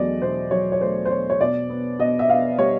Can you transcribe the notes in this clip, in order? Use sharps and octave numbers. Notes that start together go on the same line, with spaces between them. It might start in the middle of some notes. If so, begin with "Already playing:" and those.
Already playing: E2 F#3 A3 D5 D#5
B2 C5
F#3 C#5
C#5
A3 C5
C5
B2 C#5
C#5
B2 D5
B3
B2 D#5
E5
B3 F5
G3 C#5